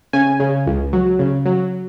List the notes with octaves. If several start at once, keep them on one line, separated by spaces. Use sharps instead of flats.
C#3 G#5
C#3
C#2
F#3
C#3
F#3